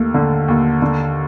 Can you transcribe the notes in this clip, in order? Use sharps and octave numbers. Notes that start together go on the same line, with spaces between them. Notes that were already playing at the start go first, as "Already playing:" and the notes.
Already playing: D#2 A3
D3
D#2
D3